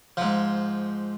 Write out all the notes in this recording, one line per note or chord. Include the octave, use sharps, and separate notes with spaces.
G#2 F3